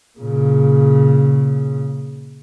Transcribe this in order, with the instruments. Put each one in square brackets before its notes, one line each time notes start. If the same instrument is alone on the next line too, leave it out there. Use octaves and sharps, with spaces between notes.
[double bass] A#2 C#3